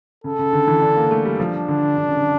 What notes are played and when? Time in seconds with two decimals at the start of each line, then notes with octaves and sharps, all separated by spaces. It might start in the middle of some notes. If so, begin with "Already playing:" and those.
0.24 C#3 A4
0.39 C#3
0.53 D3
0.68 E3
0.82 D4
0.96 A#3
1.11 A3
1.25 G3
1.40 F3 D4
1.68 D3
1.98 D3
2.08 C#3
2.20 D3